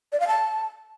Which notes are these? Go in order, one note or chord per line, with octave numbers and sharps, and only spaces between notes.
D5
F5
A5